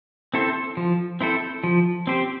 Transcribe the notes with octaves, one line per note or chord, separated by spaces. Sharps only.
C4 E4 A4 C5
F3
C4 E4 A4 C5
F3
C4 G4 C5